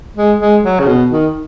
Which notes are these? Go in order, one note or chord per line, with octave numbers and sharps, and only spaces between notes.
G#3
G#3
F#3
C#3
B2
D#3